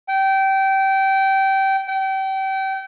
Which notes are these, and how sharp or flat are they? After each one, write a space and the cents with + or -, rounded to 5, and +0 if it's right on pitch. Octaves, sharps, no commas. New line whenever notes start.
G5 -20
G5 -30